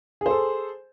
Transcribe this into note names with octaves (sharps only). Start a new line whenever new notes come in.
G#4 A4 C5